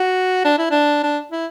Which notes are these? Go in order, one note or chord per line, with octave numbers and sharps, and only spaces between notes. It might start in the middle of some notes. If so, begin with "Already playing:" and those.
Already playing: F#4
D4
E4
D4
D4
E4